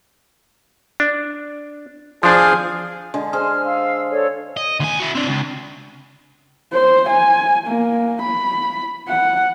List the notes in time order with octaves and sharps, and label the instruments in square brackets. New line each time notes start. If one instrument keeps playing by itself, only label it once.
[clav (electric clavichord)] D4
[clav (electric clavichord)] F3 D4 [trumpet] G#4 [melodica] C5 F5
[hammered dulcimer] D3 G#3
[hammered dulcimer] G#4 C5 [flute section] F6
[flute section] F5 E6
A4 C#5 D5
[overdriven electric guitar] D#5
D2 G#5
E4 F#4
C4 D4
C#2
[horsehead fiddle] C5
G#5
A#3
B5
F#5